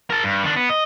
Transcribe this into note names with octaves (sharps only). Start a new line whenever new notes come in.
A#4 A5
G2
D#3 D4
B3
D#5